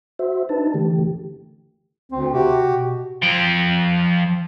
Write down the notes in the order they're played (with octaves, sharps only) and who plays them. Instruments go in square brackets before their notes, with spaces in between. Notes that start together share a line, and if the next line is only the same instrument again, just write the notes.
[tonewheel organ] F#4 C5 E5
D4 D#4 B4 A5
D3 E3 A3 G4
[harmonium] D2 [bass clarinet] C4
[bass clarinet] C3 [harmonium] F#4 G4
[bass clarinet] B2
[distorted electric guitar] F3 G5